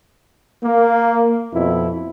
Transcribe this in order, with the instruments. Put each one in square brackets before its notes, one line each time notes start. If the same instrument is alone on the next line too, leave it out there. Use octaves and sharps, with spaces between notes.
[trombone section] A#3
F2 B2 E4